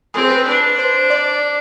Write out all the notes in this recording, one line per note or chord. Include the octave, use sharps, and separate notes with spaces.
C4 G#4
B4
D4 B4
C5
D5